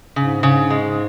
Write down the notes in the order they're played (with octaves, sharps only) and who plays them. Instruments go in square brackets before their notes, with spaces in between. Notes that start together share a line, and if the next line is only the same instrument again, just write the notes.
[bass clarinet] G#2 [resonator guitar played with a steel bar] C#3
[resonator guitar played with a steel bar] C#3
G#3